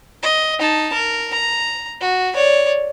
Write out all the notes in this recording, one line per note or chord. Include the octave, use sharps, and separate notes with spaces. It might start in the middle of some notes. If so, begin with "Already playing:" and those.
D#5
D#4 A5
A#4
A#5
F#4
C#5 D5